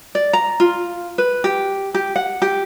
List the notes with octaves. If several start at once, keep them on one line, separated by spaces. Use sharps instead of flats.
D5
A#5
F4
B4
G4
G4
F#5
G4